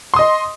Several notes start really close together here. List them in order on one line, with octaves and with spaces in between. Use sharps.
C6 D#6 D#5